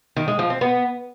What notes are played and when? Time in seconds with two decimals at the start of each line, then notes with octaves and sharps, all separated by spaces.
0.17 D#3
0.28 G#3
0.39 F3
0.50 C4
0.61 B3